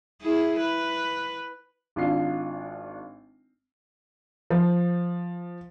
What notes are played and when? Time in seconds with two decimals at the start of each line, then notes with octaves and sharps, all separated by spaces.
0.22 E4 G#4
0.60 B4
1.96 G#1 D4 F4 C7
4.50 F3